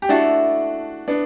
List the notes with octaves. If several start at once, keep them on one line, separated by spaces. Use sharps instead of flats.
G4
A3 D4 E4 F#4 A4
B3 D4